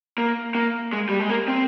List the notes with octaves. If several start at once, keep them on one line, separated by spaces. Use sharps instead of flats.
A#3
A#3
G#3
G3
G#3
A#3
C4